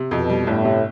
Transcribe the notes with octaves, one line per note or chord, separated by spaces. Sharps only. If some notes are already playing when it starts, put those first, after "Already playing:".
Already playing: C3
F2 B2
G3
G1 A2
C3